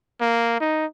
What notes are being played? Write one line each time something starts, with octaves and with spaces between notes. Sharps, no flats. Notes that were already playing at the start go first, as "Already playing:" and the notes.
A#3
D#4